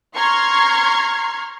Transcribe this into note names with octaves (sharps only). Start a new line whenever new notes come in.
A#5 C6 C#6 F6 G#6 C7